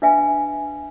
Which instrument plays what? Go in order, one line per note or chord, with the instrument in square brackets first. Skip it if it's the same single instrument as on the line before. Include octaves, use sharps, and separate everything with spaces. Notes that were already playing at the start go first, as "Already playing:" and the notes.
[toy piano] D4 B4 E5 F5 G#5